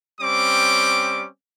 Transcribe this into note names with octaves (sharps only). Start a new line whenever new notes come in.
G3 C4 C#4 D6